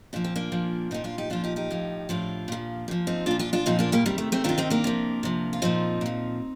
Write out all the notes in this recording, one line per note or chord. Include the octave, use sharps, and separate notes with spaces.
A#2 F3 D4
C4
A#3 D4
A#2 F3
A#2 F3 C4 D#4
D4 F4
D#4 G4
A#2 F3 D4 F4
D#4 G4
D#4 G4
A2 F3
A2 F3 D4 F4
A#2 F3
A#2 F3
C4 D#4
A#2 F3 D4 F4
D4 F4
D4 F4
A#2 F3 C4 D#4
A#3 D4
G3 A#3
C3 D#3 G3
A3
A3 C4
C3 D#3 D4 F4
C4 D#4
A#3 D4
C3 F3
C3 F3
F4
A#2 F3 C4 D#4
A#2 F3